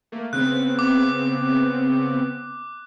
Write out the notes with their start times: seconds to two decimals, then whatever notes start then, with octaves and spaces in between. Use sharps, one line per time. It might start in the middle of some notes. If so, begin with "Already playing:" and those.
0.12 A3 A#3
0.33 C#3 B3 C4 F#6
0.79 D6